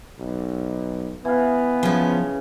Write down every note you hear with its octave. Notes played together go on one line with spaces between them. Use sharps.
B1
E3 B3 F5
C#3 F3 C#4